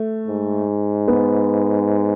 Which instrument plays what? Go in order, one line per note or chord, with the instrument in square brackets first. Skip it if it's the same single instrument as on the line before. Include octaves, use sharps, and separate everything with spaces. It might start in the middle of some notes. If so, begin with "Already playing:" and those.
Already playing: [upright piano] A3
[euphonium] G#2
[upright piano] B3